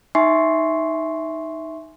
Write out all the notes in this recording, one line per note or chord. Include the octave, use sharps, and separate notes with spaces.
D#4 E5 G#5 C6 C#6 C7